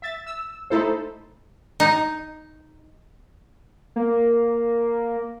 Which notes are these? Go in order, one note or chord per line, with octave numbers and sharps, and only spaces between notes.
E5 A6
E6
A3 D#4 E4 A4 C5
D#4
A#3